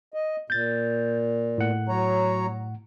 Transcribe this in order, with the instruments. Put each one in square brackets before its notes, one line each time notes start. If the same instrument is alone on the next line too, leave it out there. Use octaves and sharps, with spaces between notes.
[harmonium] D#5
[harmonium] A#2 [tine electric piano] G6 A6
[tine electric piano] A2 F#5
[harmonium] F#3 C#5 A#5